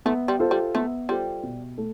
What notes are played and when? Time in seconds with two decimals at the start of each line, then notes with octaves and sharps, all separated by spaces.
0.05 A3 B3
0.28 G3
0.39 F4 A4 C5
0.51 G3
0.75 A3 B3
1.09 G3 F4 A4 C5
1.43 B2
1.78 A3